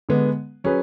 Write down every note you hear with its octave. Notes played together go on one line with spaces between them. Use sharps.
D3 G#3 B3
F#3 C#4 G#4 B4